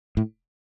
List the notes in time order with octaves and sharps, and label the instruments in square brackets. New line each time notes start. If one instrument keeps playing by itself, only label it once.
[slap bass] A2